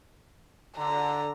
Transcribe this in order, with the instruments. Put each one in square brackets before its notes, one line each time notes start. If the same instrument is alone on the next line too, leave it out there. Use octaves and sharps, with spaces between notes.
[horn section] D3 [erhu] A#5